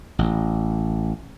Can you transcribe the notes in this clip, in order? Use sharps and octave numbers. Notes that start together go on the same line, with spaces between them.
A1